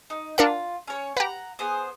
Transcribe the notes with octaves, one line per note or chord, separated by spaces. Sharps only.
D#4
D4 F4 A#4 F#5
C#4 C#5
G4 B4 F#5 G5 A#5
B3 G#4 C5